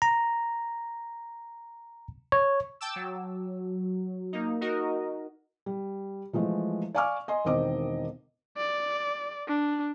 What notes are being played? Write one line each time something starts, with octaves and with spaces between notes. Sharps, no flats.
A#5
C#5
G5 A5 D6 E6
F#3
A#3 D#4
D#4 F#4 A#4 D#5
G3
E3 F3 G#3 A3
D5 F5 G#5 C#6 D6 F6
D#5 G#5 C6
E1 D#3 C4 D#5 D6
D5
D4